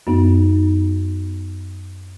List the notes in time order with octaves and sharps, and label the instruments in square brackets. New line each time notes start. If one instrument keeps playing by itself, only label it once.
[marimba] F#2 B3 D#4